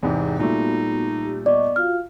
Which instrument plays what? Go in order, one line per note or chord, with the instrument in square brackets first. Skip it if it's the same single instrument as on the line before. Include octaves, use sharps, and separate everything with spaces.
[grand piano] E2 G#2 C3 [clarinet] C4
[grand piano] A#2 G3 A3 [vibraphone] B3 F#4 [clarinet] D#4
[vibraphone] G4
[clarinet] B3 [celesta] D5 [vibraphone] D#5 C#6 D6
[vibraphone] F4 F#4 F5 [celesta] F6